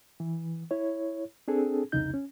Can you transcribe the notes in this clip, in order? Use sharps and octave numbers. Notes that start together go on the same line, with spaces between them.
E3
E4 C#5
C4 D4 G#4 A4
C2 F2 C#3 D#4 G6
C#4